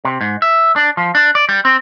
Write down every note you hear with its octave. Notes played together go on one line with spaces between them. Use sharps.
C3
G#2
E5
D4
F3
D4
D5
G3
C4